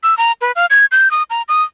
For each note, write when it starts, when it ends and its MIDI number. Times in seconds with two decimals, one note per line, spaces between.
0.03 0.15 88
0.18 0.32 82
0.41 0.52 71
0.56 0.66 77
0.70 0.86 92
0.92 1.11 91
1.11 1.23 87
1.30 1.42 82
1.49 1.63 87